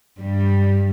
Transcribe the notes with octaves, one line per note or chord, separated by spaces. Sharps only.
G2 G3